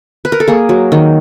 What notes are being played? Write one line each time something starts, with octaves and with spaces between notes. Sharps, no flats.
B4
A#4
A4
A#3 G#4
F#3
D#3